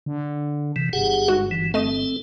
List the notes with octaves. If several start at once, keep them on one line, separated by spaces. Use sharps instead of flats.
D3
C3 E3
G1 G4 G#4 F#5
G#2 F#4
E3
A3 C4 A4 D#5 D#7